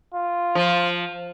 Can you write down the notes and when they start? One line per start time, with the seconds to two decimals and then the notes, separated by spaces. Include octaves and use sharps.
0.15 F4
0.55 F3